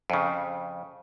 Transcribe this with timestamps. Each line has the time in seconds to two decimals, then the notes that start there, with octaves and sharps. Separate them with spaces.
0.10 F2 C#3